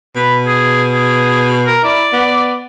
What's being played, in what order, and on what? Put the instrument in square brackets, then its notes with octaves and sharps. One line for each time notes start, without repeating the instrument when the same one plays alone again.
[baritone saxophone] B2 [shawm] B4
[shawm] G#4
G#4
A#4
[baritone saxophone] E4 [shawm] D5
[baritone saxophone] B3